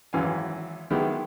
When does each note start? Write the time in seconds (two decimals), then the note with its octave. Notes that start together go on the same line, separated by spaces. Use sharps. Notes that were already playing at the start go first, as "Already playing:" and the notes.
0.13 G#1 F#2 E3 F5 G#5
0.90 D#3 F#3 G#3 B3 E4 G4